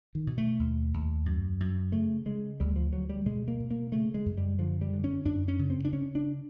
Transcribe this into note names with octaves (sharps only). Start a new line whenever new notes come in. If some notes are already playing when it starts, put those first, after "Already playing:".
D#3
B2
A3
D#2
D#2
F#2
F#2
C#3 A3
C#3 G#3
D2 G3
F3
D2 F#3
G3
B2 G#3
A#3
B2
A#3
C#3 A3
G#3
F#2
G3
D3 F3
G3
D3
C#4
F#2 D4
C#4
C#3
C4
D4
C#3 C#4
D4